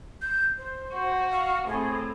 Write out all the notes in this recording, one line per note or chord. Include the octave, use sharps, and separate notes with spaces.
G6
C5
F#4
F5
A2 C4 G#4